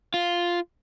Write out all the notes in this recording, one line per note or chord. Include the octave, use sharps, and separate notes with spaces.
F4